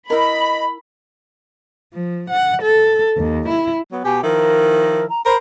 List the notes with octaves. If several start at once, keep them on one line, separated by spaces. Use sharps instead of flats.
E4 A#4 D#5 B5
F3
F#5
A4
D#2
E4
F#3 B3
B2 G4 G#5
D#3 F3 E4 A#4
A#5
A#4 C5 B5